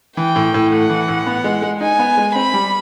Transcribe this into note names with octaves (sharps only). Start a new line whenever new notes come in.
E3 G5
A2
A2
A3 F#5
E3
A2
B3
G#3
G#3
D#4 G#5
B3
G#3
C4 B5
G3